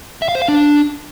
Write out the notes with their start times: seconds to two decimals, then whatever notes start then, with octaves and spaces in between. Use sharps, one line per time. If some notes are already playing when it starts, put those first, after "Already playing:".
0.22 E5
0.29 F5
0.35 C5
0.42 F5
0.48 D4